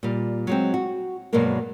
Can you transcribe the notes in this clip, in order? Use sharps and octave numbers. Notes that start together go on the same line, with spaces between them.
A#2 G3
F#3 G#3 C4
F#4
G2 B2 F#3 G#3 A#3 A#4